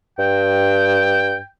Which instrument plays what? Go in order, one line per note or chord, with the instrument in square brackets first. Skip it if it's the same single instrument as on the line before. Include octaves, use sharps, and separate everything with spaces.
[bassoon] G2 [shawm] G5